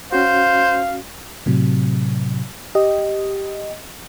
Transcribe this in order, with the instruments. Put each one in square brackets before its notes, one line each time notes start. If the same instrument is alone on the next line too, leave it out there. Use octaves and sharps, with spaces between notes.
[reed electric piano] C#4 F#4 [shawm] C5 [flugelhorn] F5
[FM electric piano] A2 C3 F#3
G4 D#5